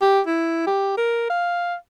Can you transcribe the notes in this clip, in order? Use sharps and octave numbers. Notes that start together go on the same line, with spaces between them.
G4
E4
G4
A#4
F5